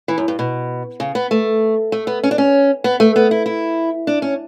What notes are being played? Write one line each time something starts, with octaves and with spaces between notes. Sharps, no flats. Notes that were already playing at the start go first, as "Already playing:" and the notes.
E3
F#2
G2
B2
C#3
B3
A3
A3
B3
C#4
D4
C#4
B3
A3
B3
E4
E4
D4
C#4